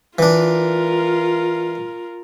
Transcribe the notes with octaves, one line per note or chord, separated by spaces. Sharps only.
E3 D4 F4 A#4